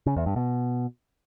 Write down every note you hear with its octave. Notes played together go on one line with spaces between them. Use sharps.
C#3
E2
G2
B2